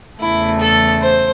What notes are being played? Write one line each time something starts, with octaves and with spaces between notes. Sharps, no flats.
E2 C#3 E3 A3 E4
A4
C5